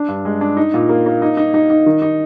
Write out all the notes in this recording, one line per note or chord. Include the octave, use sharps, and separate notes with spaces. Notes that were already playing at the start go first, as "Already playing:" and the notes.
Already playing: D4
G2
G#3
D4
D#4
A#2
A#3
A#3
D#4
D#4
D#4
D#4
D#3
D#4